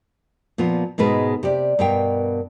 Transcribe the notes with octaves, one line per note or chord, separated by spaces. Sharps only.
A#2 F3 B3 F4
G#2 B2 G#3 B4
C3 G4 D5
G2 B2 B3 A#4 F5 G5